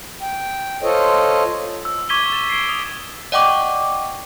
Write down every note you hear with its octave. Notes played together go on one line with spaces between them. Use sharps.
G5
F4 A4 C5 C#5 D#5
E6
C#6 D6 G#6 B6 D#7 G7
A6 E7
C7 D7 G7
D#6
D5 D#5 F#5 G5 C#6 D6